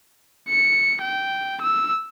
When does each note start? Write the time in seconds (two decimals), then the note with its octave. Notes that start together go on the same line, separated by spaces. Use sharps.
0.49 C#7
1.01 G5
1.61 E6